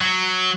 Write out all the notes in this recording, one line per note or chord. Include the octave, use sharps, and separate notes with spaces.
F#3